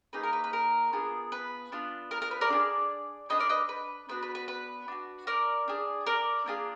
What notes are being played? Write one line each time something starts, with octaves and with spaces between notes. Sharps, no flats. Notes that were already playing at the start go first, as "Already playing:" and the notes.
A#3 D#4 G#4 B4
A#4
B4
B4
A#4
B3 D4 F4 G#4
B4
B3 D4 F4
A#4
A#4
B4
A#4 D5
D4 F4 G#4
D4 G#4 B4 D#5
A#4 D5
B4 D#5
B4
B3 D4 F#4 B4
B4
B4
B4
D4 F#4
A#4 D5
D4 G#4
A#4 D5
A#3 D4 F4 G#4